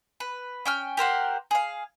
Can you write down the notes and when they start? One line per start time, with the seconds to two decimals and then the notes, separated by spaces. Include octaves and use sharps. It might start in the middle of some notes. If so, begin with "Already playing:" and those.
0.20 B4
0.66 C#4 G5 F6
0.97 G4 A#4 C5 F#5
1.51 G#4 F5